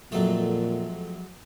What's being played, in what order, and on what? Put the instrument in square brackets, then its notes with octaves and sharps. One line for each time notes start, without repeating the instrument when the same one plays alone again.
[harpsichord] F2 A3 [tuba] A#2 [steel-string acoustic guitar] F#3 G#3